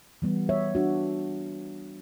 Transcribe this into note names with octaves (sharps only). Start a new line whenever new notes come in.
E3 G3 B3
C#5 E5
D4 F#4